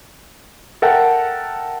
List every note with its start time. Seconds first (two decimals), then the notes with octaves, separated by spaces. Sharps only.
0.82 A4 A#4 E5 F#5 G5 A5